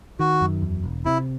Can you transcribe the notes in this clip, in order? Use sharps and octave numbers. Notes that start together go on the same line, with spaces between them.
D#3 F#4
F#2
E2
E1
C3 E4